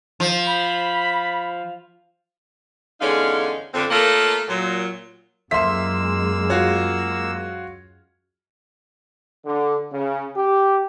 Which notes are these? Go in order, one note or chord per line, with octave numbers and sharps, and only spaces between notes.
F3
B5
E2 D3 G#3 C#4 D#4 F5
F2 D3 C4
A3 A#3 F4 A4 A#4 C#5
A#2 F#3
F#2 F3 G#3 A#3 E5 C6 E6 B6
F4 F#4 C#5
D3
C#3
G4